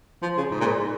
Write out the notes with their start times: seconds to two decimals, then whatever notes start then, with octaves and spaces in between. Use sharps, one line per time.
0.23 F3
0.37 C#3
0.51 G#2
0.61 A#2
0.66 G#2